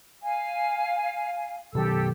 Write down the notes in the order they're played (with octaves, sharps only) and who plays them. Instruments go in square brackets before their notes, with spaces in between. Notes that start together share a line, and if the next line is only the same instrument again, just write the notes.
[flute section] F5 G#5
[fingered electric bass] B2 D#3 F#3 [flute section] G4 A4 E6